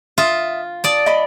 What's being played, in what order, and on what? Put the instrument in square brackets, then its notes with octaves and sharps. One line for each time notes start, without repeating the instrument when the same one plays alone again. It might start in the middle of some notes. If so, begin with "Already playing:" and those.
[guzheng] F4 [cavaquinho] E5 C6 D#6
[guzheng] D5 A5 [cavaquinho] D#6
[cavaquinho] D#5 B5